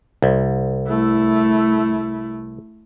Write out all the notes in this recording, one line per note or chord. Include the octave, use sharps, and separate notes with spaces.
C2
A3 E4